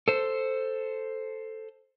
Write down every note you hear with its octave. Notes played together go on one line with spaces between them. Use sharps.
A4 C5